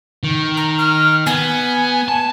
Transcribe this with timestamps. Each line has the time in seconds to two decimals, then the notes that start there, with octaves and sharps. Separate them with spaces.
0.23 D#3
0.57 A#5
0.78 F6
1.26 B3 G#5
2.08 A5